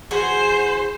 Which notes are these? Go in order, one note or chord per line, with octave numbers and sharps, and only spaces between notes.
E3 F#4 G#4 C5